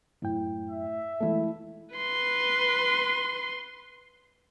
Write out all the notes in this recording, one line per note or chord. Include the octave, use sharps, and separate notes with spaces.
F#2 A2 G5
E5
E3 G#3 A3 E4 A4
B4 C6